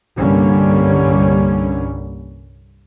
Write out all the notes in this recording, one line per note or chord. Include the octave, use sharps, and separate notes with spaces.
C2 G2 D3 G3 A#3 C#4